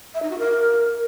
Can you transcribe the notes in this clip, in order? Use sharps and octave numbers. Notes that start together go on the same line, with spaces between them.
E5
D#4
F#4
A#4